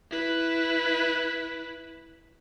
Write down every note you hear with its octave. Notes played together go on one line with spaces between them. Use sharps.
E4 B4